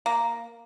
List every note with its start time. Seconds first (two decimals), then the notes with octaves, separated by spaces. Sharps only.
0.06 A#3